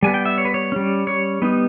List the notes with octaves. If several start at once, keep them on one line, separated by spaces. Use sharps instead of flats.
G3 B3 G#5
G5
E5
C#5
B4
C#5
G3 C#4
C#5
G3 B3 D#4